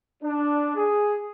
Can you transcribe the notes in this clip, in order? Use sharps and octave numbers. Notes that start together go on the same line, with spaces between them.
D4
G#4